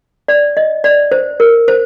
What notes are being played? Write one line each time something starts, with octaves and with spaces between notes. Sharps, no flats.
D5
D#5
D5
C5
A#4
C5